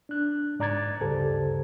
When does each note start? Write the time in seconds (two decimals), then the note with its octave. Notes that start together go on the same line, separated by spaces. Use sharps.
0.09 D4 F#6
0.60 G#2 D5 A#5 D6 G#6 A6
1.01 D2 G2 C#3 G4 A4 C5